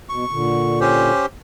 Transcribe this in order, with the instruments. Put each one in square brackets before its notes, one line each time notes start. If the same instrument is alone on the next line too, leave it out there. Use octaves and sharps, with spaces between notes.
[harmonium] B2 [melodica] C#6
[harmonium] A#2 D3
[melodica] C#4 G4 C5